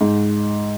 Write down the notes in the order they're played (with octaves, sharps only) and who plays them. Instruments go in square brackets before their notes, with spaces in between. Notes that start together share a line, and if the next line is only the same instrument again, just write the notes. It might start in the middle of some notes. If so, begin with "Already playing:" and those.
[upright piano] G#2